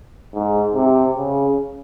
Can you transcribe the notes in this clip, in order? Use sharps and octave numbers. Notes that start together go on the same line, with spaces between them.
G#2
C3
C#3